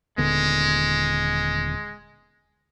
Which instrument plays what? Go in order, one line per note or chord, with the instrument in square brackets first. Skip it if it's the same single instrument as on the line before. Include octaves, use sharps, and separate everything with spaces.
[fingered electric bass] D#1 D3 B3 [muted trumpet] G#3